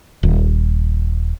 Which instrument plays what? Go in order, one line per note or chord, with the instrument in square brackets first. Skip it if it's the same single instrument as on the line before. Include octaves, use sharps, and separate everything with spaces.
[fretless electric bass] D#1